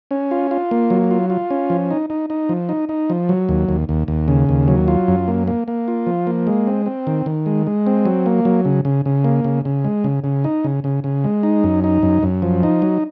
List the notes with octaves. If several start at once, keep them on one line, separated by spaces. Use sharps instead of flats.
C#4
F4
F4
A#3
F#3
F4
F4
C#4
F3
D#4
D#4
D#4
F3
D#4
D#4
F3
F#3
D#2
D#2
D#2
D#2
C#3
D#2
F#3
F4
F#2
A#3
A#3
A#3
F4
F3
A#3
G#3
C4
C4
D#3
D#3
G#3
G#3
C4
F#3
A#3
F#3
C#3
C#3
C#3
A#3
C#3
C#3
G#3
C#3
C#3
D#4
C#3
C#3
C#3
G#3
D#4
F#2
D#4
F#2
F#2
F3
D#4
F#3